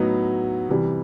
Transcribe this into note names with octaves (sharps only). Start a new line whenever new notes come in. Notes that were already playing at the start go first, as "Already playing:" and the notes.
Already playing: A2 F#3 B3 D#4
C3 E3 G3